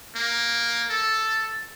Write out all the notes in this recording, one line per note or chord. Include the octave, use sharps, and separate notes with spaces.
A#3
A4